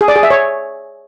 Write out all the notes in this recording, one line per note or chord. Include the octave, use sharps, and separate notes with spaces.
G#4
D5
G#4
E5
C#5